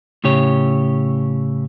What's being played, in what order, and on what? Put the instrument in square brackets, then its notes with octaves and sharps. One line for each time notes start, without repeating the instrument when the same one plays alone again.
[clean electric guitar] A2 C#3 G4 C#5